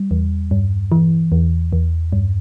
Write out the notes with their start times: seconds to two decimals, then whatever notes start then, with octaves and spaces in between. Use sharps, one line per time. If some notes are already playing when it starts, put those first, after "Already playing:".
Already playing: G3
0.11 E2
0.51 G2
0.92 E3
1.32 E2
1.73 E2
2.12 G2